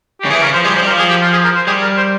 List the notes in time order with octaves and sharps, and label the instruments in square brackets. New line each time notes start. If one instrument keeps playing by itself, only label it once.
[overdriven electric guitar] C#3 [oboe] G4
[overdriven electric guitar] E3 [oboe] G#4
[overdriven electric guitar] C#3 [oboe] A#4
[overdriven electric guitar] F3 [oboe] C5
[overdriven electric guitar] G3 [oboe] G#4
[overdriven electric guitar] F3 [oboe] C5
[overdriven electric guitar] G3
[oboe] A#4
[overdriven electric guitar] F3
[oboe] G#4
G4
F4
G#4
A#4
C5
[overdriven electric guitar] G3 [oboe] G#4
[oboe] A#4
C5